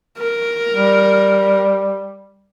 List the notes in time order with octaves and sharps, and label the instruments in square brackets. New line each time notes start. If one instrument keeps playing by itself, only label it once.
[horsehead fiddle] A#4
[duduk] G3